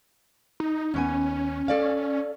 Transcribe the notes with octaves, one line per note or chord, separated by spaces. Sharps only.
D#4
D#2 B3 C#4 G#5
A4 D5 F5